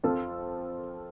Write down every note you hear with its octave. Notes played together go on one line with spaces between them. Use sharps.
F2 F3 C4 F4 A4